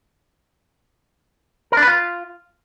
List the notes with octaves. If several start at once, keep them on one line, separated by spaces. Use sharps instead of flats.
A#4
D4
B4
F4